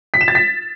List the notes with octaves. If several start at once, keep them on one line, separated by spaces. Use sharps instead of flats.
B6
E7
A6
B6